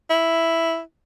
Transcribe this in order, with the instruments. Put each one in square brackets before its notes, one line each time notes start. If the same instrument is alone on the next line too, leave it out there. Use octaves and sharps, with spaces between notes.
[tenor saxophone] E4